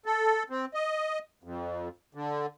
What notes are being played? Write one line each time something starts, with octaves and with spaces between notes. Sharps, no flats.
A4
C4
D#5
F2
D3